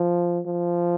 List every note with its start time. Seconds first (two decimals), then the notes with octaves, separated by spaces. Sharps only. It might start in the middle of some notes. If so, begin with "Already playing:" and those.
Already playing: F3
0.46 F3